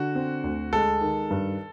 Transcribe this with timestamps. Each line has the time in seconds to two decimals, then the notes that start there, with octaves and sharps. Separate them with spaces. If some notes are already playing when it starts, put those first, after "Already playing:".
Already playing: D3 F#4
0.15 C4
0.44 D2
0.73 G#3 A4
1.01 D#3
1.30 G2